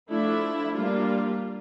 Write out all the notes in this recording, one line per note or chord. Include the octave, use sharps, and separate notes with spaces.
F3 A3 D4 E4
G3 A#3 D4 F4